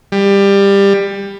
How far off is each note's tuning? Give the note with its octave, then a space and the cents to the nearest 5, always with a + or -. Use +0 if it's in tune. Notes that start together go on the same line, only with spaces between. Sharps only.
G3 +20